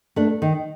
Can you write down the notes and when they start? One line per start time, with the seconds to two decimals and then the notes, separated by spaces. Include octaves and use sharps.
0.16 A3 D4
0.42 D#3